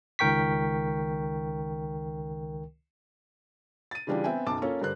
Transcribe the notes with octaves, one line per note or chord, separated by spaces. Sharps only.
C#2 D#3 A#4 G5 C#6 B6
A6 D#7
C#3 E3 G3 D4 F4 G4
B3 C4 E5 G5 G#5
B1 F#2 A5 D6
A#3 C#4 F4 A4 C#5
G2 D3 G4 A#4 C5 F#6